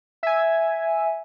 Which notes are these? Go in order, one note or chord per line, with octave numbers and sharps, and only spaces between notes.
E5 G#5